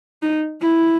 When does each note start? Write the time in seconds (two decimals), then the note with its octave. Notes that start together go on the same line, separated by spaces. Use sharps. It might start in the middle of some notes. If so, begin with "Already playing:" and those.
0.22 D#4
0.61 E4